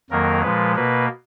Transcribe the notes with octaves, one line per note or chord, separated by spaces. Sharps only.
F2 D#3 F#3 A#3 A#4
A#2 F3 G#3 B4
B2 A#3 B4